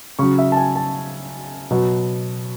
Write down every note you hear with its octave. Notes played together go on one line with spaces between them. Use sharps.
C#3 F#3 C#6
E5
A5
G#5
A5
B2 F#3